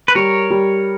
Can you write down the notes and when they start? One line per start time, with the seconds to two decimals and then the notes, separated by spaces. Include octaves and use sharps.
0.08 B4
0.15 G3 A#4 C#5
0.50 G3